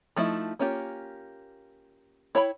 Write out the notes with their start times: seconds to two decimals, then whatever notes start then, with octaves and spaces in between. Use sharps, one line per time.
0.16 F3 A3 D#4 E4
0.59 A#3 C#4 F4 G4
2.35 E4 C#5 G5 B5